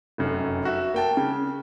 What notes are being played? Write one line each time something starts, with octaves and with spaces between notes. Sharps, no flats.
F1 F#2
F#4 E5
A#3 G5 A5
C#3